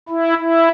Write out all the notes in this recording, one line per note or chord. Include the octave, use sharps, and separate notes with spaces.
E4
E4